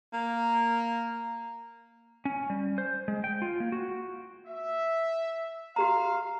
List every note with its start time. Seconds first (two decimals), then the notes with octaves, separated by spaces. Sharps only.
0.13 A#3
2.25 C#4
2.50 G3
2.78 C5
3.08 G#3
3.24 G5
3.42 F4
3.60 A#3
3.72 F#4
4.47 E5
5.76 F#4 G4 F5 A#5